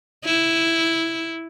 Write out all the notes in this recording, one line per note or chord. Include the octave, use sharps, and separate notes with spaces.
E4